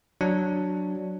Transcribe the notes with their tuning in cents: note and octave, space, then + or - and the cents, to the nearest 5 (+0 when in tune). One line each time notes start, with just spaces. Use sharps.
F#3 +0 D4 +0